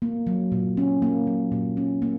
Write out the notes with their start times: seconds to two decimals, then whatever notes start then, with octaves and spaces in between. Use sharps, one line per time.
0.02 A#3
0.27 F#3
0.52 A#2
0.77 C#4
1.02 A#3
1.27 F#3
1.52 A#2
1.77 C#4
2.02 A#3